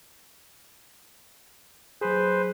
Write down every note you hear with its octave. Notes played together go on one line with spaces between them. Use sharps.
F#3 G#4 B4 C5